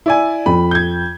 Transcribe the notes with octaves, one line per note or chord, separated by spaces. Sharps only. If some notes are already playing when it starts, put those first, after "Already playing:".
E4 D5 G#5
F2 B5
G6 G#6